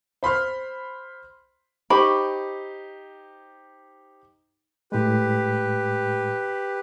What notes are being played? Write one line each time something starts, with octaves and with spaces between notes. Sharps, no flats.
C5 B5 C6 F6
D#4 G4 C5 G5 B5 C#6 D6
A2 G#3 G4 B4